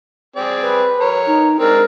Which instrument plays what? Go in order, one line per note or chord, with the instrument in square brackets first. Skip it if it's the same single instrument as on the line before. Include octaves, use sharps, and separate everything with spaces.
[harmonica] C4 G#4 D5
[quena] B4
[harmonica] A#4 C#5
[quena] D#4
[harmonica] G#3 C4 D4 [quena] A#4